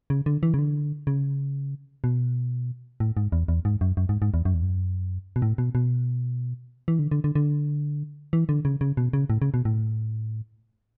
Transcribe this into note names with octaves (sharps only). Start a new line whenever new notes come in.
C#3
D3
E3
C#3
D3
C#3
B2
A2
G#2
E2
E2
G#2
F#2
F#2
G#2
G#2
E2
F#2
E2
F#2
B2
A2
B2
B2
E3
D3
D3
D3
D3
E3
D3
C#3
C#3
B2
C#3
A2
C#3
B2
A2